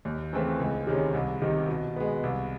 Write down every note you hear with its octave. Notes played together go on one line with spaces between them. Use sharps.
D#2
C#3 E3 A3 C4
C#2
C3 D#3 G#3 C#4
C2
C3 D#3
B2
G#3 B3
C2